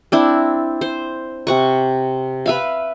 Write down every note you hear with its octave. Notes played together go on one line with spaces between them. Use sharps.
C4 D4 E4
C5
C3 F#5 C#6
B4 E5 F5